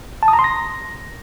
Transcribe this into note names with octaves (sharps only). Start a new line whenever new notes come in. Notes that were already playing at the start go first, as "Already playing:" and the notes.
A5
D#6
A#5
C6
A#6